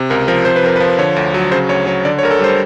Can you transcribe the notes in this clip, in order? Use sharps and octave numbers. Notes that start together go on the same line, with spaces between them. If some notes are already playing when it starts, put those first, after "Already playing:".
Already playing: C3
C#2 A#4
F3 A#4
C3 C5
B4
F2 A#4
B4
F3
D3 C#5
D2
F#3
C#3 C5
D2 C#5
F#3 C#5
D3 D5
C#5
D2 A#4
A4
G3 C5